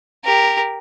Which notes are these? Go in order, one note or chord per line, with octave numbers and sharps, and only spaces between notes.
G4 A#4